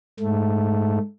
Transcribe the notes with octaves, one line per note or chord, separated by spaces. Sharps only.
G#2 A3